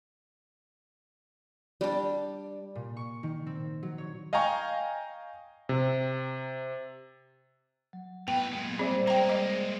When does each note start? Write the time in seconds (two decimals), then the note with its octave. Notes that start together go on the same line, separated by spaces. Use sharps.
1.81 G3 D4
2.75 A#2
2.97 C#6
3.23 D#3
3.47 C4
3.83 F#3
3.98 C#5
4.33 D#5 F5 G5 G#5 A#5 C#6
5.69 C3
7.93 F#3
8.28 A2 B3 B4 G5
8.53 A#2 G#3
8.79 G3 C4 G#4 C5 D5 E5
9.07 G#3 A#3 G5 A#5
9.29 D#5